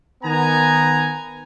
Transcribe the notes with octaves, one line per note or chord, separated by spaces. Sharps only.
D#3 B3 G#5 A#5